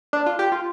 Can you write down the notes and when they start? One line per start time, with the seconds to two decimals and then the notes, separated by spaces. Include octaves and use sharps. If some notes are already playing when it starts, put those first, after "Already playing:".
0.13 D4
0.26 F4
0.39 G4
0.52 F4